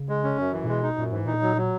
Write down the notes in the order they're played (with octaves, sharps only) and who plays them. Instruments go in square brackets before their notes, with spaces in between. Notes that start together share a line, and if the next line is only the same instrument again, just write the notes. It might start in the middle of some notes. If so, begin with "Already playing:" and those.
Already playing: [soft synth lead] C#3
[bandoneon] G#3
C#4
F#2
E3
[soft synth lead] A#2
[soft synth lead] B2 [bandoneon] G#3
[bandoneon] D#4
[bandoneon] F#2 [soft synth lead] A#2
[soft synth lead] G#2 [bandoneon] E3
[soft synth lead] A#2 [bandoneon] D#4
[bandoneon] F#3
F#3